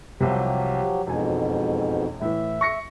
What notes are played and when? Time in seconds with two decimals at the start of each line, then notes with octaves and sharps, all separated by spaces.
0.21 C2 C3 F3 F#3 G4
1.07 E1 F2 G#2 B2 G#5
2.21 A2 E3 E5
2.61 C#6 A#6 C#7